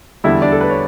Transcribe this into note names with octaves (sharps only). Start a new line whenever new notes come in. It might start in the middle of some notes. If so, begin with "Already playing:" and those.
E2 D3 G3 E4 E5
D4 D5
A4
B4
C#5